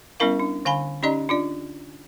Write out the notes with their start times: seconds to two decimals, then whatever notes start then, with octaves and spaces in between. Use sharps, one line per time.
0.20 G3 B3 C#4 E4 A#4 F5
0.40 D4
0.65 D3 F5 G#5 B5
1.03 C#4 D#4 G4 D5 D#5 A#5
1.29 D4 F4 D5